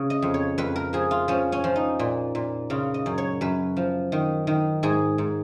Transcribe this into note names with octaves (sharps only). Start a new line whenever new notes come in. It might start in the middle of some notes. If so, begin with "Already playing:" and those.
Already playing: C#3
D#5
F2
C#5
F2 B4
A#4
F3 G#4
F4
F3 C#4
C#4
F3
D#4
A#2
A#2
C#3 F4
D#5
F#2
C#5
F#2 B4
F3
D#3
D#3
G#2 G#4
G#2